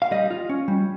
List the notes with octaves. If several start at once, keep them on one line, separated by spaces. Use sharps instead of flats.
F5
G3 D#5
F4
C#4
G3